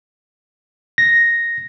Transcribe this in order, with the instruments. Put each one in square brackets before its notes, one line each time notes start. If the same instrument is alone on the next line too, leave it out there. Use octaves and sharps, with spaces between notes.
[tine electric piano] A#6